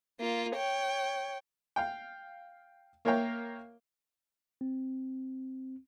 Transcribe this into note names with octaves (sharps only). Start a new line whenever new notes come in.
A#3 F4
C#5 G5
F5 G5
A#3 A#4 C#5 E5 F5 G5
C4